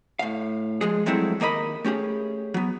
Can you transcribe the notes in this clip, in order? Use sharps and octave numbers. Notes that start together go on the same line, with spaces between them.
A2 F5
F3 G#3 G#4
F3 F#3 G#3 A3 C4 E4
D#2 A#3 A#4 D#5 B5
A3 C#4 G4 G#4
F#3 B3